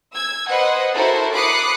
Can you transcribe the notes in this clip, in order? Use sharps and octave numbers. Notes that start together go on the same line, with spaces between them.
E6 G#6
B4 C5 D#5 F#5
E4 F#4 A4 A#4 C5
B5 D6 D#6 F#6 C7 C#7